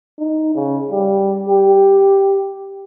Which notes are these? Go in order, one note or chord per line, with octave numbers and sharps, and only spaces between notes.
D#4
C#3
G3
G4